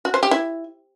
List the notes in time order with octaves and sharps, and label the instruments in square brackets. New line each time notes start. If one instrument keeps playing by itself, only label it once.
[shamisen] F#4
C5
G4
E4